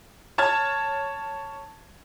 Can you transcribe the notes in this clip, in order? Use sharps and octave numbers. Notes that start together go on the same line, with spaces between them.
C#5 A5 F6 G#6